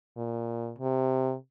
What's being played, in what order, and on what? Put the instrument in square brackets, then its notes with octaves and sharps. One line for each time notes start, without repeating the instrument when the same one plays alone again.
[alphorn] A#2
C3